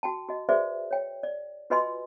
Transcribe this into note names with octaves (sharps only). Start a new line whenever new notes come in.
F#4 G5 A5
F#4 D#5
F#4 G#4 B4 C5 D5 E5
C#5 G5
D5
F4 F#4 B4 D#5 G#5 C6